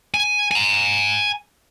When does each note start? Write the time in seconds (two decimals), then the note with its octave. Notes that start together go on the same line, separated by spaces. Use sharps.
0.14 G#5
0.51 G#5 A#5